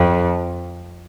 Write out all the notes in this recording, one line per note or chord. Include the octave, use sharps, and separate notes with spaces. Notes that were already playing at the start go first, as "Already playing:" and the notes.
Already playing: F2